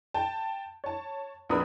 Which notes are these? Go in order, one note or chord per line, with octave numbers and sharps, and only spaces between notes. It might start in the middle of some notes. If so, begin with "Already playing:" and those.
G5 A5
C#5 A5
A#1 F2 B3 A#4 B5 D#6